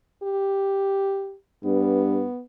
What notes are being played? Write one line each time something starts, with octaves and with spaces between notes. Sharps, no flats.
G4
G2 B3